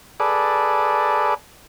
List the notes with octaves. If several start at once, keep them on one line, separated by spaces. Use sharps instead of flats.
G#4 A4 B4 D5